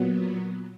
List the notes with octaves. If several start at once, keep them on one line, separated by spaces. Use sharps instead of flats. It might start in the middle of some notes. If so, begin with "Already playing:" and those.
Already playing: A#2 F#3 B3